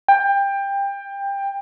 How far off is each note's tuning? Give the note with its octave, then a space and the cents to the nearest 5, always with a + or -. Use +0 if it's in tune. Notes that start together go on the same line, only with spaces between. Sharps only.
G5 +20